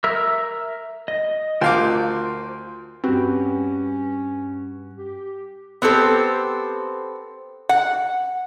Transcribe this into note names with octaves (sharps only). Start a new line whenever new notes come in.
A#4 E5 E6
D#5
D2 F4 A#4 C5 F5 D6
G2 C4 C#4 F#4 G4 B4
G4
B3 C4 G4 A4 C5
F#5